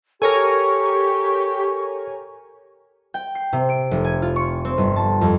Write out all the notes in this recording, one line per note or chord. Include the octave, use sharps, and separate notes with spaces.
G4 A4 A#4 C#5 G#5 C#6
G5
C7
C3
D7
F1
G#5
F4
C#6
C4
G1
A5
F2